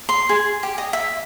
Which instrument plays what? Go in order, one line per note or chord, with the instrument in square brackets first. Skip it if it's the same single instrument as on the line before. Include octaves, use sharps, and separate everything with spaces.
[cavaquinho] C6
G#4
G4
D#5
E5